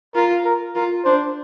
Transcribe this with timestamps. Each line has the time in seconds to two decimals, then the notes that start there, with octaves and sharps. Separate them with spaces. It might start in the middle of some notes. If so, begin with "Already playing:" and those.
0.15 F4 A#4
0.45 A#4
0.75 F4 A#4
1.05 D4 C5